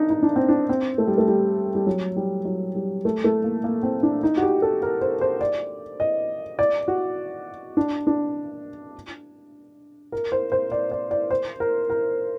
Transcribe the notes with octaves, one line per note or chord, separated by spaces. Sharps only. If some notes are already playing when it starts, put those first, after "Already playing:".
Already playing: D4 D#4
D#4
D4
C4
D4
C4
A3
G3
A3
G3
G3
F#3
G3
F#3
G3
A3
A3
A#3
A#3
C4
D4
D#4
F#4
G4
A4
A#4
C5
C5
D5
D#5
D5
F#4
D4
D4
A#4
C5
C5
D5
D5
D5
C5
A#4
A#4